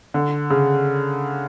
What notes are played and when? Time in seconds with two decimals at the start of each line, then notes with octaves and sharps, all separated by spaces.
0.14 D3
0.50 C#3